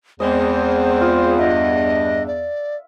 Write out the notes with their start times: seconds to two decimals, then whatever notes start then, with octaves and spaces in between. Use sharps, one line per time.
0.20 E2 G#3 C4 C5 D5 D#5
1.01 F4 D#6
1.39 G2 D4 D#5 E5
2.27 D5